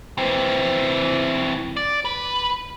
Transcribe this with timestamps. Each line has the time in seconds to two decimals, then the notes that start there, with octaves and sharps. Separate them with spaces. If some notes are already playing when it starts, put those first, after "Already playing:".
0.18 E3 C4
1.77 D5
2.05 B4